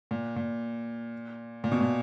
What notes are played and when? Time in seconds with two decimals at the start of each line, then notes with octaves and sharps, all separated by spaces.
0.11 A#2
0.36 A#2
1.64 A#2
1.72 B2
1.81 A#2